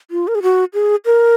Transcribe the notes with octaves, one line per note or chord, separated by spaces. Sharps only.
F4
A#4
G#4
F#4
G#4
A#4